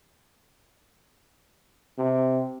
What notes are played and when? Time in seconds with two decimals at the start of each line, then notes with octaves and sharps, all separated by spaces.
1.98 C3